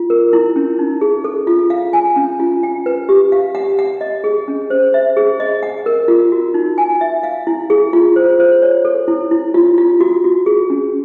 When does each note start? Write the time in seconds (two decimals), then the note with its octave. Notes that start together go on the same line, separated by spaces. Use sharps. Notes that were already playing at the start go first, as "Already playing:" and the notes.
Already playing: F4
0.10 A#4
0.33 E4
0.56 C#4
0.79 D#4
1.01 G#4
1.24 A4
1.47 F4
1.70 F5
1.93 G#5
2.16 C#4
2.40 F4
2.63 G5
2.86 B4
3.09 G4
3.32 F5
3.55 F#5
3.79 F#5
4.01 D#5
4.24 G#4
4.48 C#4
4.70 C5
4.94 E5
5.17 G#4
5.40 D#5
5.63 F#5
5.86 A#4
6.08 F4
6.32 F#4
6.54 D#4
6.78 G#5
7.01 E5
7.23 F5
7.47 E4
7.70 G#4
7.93 F4
8.16 C5
8.39 C5
8.62 C#5
8.85 A4
9.08 E4
9.31 E4
9.54 F4
9.78 F4
10.00 F#4
10.24 F#4
10.46 G#4
10.70 C#4